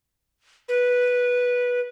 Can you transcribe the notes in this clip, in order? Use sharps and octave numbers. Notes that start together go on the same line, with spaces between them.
B4